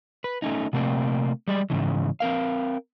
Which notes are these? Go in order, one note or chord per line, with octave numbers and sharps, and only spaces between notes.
B4
A3 C#4 D#4
C3 A3 A#3 C4
G3 G#3 D5
G#2 C#3 E3
C4 A#4 F5